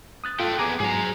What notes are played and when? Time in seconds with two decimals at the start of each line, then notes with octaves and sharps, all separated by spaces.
0.24 D#6 F#6 A6
0.40 F4 A4 G5 F#6
0.59 B3 G#4 A#5 D6
0.80 G#2 F#3 G#4 A#5